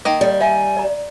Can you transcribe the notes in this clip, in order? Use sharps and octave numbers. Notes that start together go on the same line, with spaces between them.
D#3 A#3 D#5
G3
D5 E5 G#5 A#5
D5 A#5